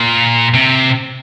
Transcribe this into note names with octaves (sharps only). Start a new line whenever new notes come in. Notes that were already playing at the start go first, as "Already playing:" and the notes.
Already playing: A#2
C3